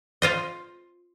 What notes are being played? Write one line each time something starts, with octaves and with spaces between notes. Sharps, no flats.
F4 C5 D#5